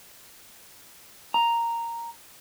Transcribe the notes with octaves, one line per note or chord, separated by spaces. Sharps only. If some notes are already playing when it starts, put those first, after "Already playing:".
A#5